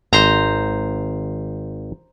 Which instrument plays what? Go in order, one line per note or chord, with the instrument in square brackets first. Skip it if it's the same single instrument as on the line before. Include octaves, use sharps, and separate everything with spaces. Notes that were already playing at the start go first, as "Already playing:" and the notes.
[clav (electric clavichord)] G#1 [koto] C5 A#5